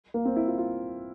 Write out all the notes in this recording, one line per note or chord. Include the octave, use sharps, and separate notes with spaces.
A#3
C4
E4
F4
F4